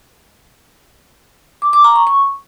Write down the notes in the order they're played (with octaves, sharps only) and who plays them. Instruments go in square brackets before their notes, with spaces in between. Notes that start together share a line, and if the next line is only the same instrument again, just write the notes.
[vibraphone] D6
D6
A#5
C#6
C#6